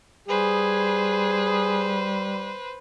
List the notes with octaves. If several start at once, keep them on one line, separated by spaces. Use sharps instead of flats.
G3 G#4 B4 C5